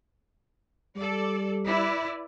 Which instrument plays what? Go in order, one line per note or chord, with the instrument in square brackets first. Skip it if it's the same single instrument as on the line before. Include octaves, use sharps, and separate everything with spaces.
[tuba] G3 [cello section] A4 D5
[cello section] E4 B4 D5